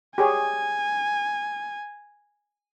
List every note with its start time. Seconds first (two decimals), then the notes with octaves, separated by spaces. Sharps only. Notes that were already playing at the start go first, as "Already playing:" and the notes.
0.18 G4 G#4 C#5 G#5